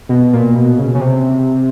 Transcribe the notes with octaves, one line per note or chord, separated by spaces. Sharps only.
B2
A#2
B2
C#3
C#3
C3